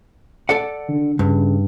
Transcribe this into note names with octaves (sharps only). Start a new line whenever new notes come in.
A4 D5 F#5
D3
G2 C#3